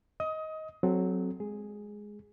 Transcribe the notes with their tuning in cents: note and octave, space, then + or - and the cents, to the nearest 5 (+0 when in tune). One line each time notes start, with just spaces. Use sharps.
D#5 +15 D#6 +25
F#3 +0 C4 +0 A4 -30
G#3 +0 G#4 +0